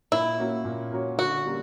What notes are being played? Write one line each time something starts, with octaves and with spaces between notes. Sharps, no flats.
A#2 E4
A#3 C#4 F#4 C#5
A#2
A#3 C#4 F#4 C#5
D3 F#4
G3 A#3 C#4